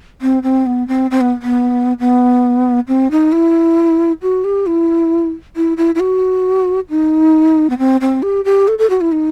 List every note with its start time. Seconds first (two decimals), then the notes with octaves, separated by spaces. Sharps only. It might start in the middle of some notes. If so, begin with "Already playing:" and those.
0.22 C4
0.43 C4
0.66 B3
0.88 C4
1.11 C4
1.21 B3
1.42 B3
2.00 B3
2.88 C4
3.11 D#4
3.32 E4
4.22 F#4
4.44 G4
4.67 E4
5.56 E4
5.77 E4
5.95 E4
6.00 F#4
6.90 D#4
7.70 B3
7.78 C4
8.01 C4
8.22 G4
8.45 G4
8.68 A4
8.78 A4
8.90 F#4
9.01 E4
9.12 D#4